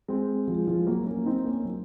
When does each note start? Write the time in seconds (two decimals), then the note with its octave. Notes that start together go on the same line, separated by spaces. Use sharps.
0.08 G#3 C4
0.47 F3 G#3
0.68 F3 G#3
0.87 F#3 A#3
1.06 A#3 C#4
1.26 C4 D#4
1.38 D#4
1.45 A#3 C#4
1.65 F#3 A#3